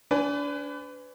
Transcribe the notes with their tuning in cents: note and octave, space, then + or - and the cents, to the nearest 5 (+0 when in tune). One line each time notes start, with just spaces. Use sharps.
D4 -30 B4 +30 G#5 +0